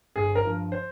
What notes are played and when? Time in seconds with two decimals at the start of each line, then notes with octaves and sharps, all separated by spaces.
0.16 G1 G#4
0.35 A#4
0.45 G2 F3
0.72 C5